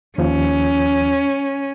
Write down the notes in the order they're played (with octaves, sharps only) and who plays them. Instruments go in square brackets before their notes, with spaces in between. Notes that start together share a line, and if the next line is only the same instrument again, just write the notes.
[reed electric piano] D#2 F3 [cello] C#4